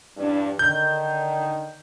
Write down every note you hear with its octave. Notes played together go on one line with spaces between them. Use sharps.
E2 G2 D4
D3 D#3 G6